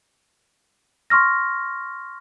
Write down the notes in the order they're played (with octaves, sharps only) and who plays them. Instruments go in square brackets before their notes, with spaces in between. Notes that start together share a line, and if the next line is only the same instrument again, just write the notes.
[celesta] C6 C#6 F6 A#6